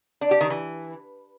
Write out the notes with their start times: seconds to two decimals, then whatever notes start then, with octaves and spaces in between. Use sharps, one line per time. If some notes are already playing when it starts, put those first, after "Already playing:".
0.21 D4
0.31 G4
0.41 D#3
0.50 E3